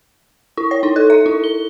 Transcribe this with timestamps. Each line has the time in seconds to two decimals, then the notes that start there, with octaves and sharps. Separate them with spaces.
0.57 E4
0.71 C#5
0.83 D#4
0.96 A4
1.10 E5
1.26 E4
1.44 G7